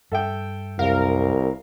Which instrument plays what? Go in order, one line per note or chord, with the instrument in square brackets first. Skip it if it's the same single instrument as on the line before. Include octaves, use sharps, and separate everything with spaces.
[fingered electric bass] G2 [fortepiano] A4 E5 G5
[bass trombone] C2 [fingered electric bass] F#2 [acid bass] A#4 [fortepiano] F5